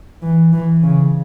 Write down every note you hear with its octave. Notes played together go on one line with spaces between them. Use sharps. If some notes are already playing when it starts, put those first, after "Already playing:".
E3
E3
C#3